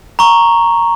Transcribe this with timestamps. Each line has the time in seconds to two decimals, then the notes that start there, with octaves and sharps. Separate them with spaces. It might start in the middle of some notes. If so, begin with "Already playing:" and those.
0.19 A#5 C#6